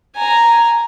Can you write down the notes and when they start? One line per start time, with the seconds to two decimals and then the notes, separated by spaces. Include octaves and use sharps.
0.16 G#5 A#5